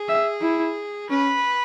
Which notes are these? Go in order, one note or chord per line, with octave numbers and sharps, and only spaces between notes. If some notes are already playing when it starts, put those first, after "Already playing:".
Already playing: G#4
E5
E4
C#4 B4